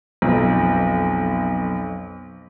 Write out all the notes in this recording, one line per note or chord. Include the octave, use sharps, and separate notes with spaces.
B1 F2